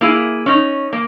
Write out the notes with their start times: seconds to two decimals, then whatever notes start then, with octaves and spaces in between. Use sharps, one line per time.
0.01 A#3 E4 G#4
0.46 C#4 D#4
0.93 A#3